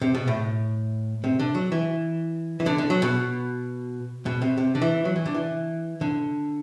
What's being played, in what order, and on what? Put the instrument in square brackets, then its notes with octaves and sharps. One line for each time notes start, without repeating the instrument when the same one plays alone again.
[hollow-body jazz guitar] C3
B2
A2
C3
D3
F#3
E3
E3
D3
D3
F#3
B2
B2
C3
C3
D3
E3
F#3
E3
D3
E3
D3